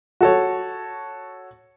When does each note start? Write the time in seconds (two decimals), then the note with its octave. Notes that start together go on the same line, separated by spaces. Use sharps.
0.21 F#4 A4 C#5